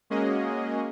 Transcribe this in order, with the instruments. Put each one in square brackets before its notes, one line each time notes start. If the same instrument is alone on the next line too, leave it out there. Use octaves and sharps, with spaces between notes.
[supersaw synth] G#3 A#3 C#4 F#4 G#4 D#5